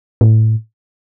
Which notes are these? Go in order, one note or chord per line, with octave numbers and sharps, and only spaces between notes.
A2